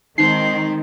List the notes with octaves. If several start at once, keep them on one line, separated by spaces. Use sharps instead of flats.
D#3 G#3 C4 D#4 G4 C7